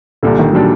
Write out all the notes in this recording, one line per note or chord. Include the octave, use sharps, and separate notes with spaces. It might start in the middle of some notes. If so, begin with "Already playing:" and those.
C2 A#2 D3 G3 D4
D#3
A#2 F#3 G3 D4